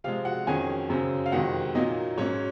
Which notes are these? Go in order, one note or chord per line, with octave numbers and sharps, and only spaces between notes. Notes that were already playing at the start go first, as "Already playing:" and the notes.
C3 F3 G#3 F4 F5
F#4 F#5
F2 D#3 F#3 C#4 G#4 G#5
F#2 C#3 F#3 C4
F5
F2 C3 D#3 G#3 F#4 F#5
A#2 F#3 A#3 D#4 D#5
G#2 F#3 C#4 C#5